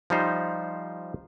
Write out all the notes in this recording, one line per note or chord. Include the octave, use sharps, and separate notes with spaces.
F3 G3 D#4 C5